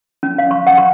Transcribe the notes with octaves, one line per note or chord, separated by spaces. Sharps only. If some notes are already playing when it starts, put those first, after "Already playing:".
C#4
F5
C#6
F#5
C#6